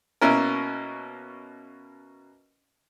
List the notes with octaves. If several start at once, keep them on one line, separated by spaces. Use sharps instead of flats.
B2 A#3 C#4 E4 A#4